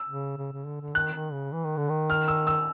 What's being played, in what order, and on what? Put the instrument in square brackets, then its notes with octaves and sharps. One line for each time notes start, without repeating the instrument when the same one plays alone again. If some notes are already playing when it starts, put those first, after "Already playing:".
Already playing: [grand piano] E6
[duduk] C#3
C#3
C#3
D3
D3
[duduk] D#3 [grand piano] F#6
[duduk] D#3
C#3
E3
D#3
D3
D#3
[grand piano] F6
E6
E6